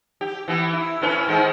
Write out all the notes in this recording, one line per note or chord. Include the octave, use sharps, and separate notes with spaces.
G4
E3 B3
E4
A2 C#4 B4
G#2 D#3 G#3